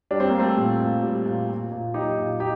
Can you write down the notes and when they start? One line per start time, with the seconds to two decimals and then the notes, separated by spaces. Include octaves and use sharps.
0.11 G3 D4
0.20 C4
0.30 G3 A#3
0.39 A3 C4
0.57 A#2
0.80 A#2
1.03 G3
1.26 A#2
1.48 A#2
1.71 A#2
1.94 F#3 D#4 G4
2.18 A#2
2.40 A#2 D#4 G4